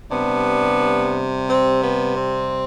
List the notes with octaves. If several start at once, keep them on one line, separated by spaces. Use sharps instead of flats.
C3 G3 B3 D4
C4
B3
C4